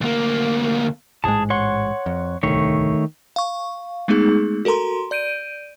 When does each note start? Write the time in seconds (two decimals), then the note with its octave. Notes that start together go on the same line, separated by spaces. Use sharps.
0.01 D2 A#3
1.24 A1 G#2 G#3 G#4 A5
1.50 C#5 F#5 C6
2.06 F2
2.43 D1 C2 D#3 A3 C#5
3.36 F5 C#6
4.08 G#3 A3 B3 D#4 G#4
4.65 F#4 A4 A#4 A#5 C6
5.11 D5 G6 D7 D#7